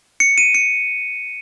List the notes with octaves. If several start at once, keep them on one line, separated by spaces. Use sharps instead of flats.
C#7
D#7
C#7